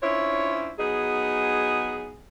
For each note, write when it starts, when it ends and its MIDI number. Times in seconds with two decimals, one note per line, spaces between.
0.03 0.72 61
0.03 0.72 62
0.03 0.72 64
0.03 0.72 65
0.03 0.72 72
0.03 0.72 73
0.79 2.18 54
0.79 2.18 59
0.79 2.18 63
0.79 2.18 68